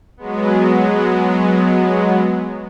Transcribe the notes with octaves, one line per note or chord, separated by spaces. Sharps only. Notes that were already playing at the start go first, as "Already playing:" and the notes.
F#3 G#3 B3